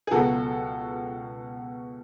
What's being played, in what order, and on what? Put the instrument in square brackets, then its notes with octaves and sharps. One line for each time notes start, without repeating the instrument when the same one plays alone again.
[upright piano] G#4
C#2 B2 F#3 B3 F#4 A4